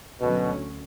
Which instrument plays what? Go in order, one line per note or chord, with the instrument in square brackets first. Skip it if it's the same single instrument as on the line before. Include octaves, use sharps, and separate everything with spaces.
[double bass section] D2 D3 F#3 C#4 [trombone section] B2